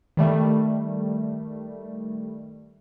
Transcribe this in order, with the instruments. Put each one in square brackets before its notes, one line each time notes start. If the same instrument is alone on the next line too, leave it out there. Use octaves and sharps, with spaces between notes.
[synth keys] D#3 G3 A3